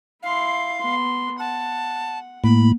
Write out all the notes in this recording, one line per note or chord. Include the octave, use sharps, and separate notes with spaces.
E4 F5 C6
B3 C6
F#5 A5
A2 A#3 B5